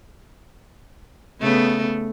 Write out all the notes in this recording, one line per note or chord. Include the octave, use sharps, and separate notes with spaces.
C#3 A3 B3